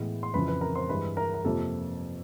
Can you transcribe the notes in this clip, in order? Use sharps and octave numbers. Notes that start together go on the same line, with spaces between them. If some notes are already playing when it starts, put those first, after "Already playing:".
Already playing: A2 E3 G#3 B3
C6
F2 C#3 E3 B4 B5
B4 B5
A#4 A#5
C5 C6
G2 E3 G#3 B4 B5
A#4 A#5
A#5
F2 C3 F3 A#3 A4 A5